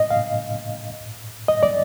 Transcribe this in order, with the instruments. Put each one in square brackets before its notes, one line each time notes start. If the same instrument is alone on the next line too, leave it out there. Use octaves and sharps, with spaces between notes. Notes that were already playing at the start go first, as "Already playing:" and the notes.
Already playing: [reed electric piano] D#5
F5
D#5
D5